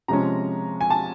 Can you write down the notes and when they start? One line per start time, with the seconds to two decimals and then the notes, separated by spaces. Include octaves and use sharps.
0.08 C3 F3 G#3 C#4 A#5
0.81 G#5
0.90 A5